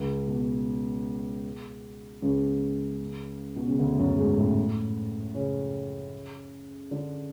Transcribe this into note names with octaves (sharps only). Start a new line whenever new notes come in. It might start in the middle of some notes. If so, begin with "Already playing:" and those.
Already playing: C#2 C#3
B2
C#2 C#3
B2
C#3
D2 D3
F#2 F#3
G#2 G#3
A2 A3
C#3 C#4
D3 D4